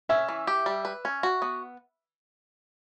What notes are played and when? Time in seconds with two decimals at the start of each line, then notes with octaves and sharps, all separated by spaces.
0.09 C#4 E5
0.29 E3
0.47 G4
0.66 G3
0.85 B4
1.05 C#4
1.23 F#4
1.42 B3